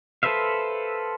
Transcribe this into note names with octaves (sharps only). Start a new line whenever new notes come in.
A4 B4 C5 E5 F5